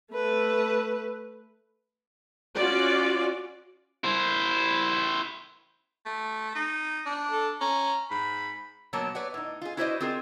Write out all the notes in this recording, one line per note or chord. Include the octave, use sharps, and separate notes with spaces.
A3 B4
C#4 F4 F#4 D5
E4 C5
A3
D#4
D4
A4
C#4 A#5
G#2 B5
B2 F#3 A#3 C#5 A5
B4 C#5 D5 F#5
A2 D#4
F4 G#4
E4 F#4 B4 C5 D5 D#5
C4 F4 G#4 A#4